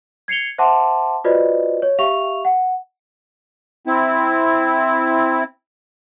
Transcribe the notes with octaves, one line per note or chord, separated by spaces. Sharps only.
G#6 C7 C#7 F7 G7
C5 E5 F#5 A5 C6 D6
F4 F#4 B4 C5 D5 D#5
C#5
G4 E5 F5 C#6 F7
F#5
C4 E4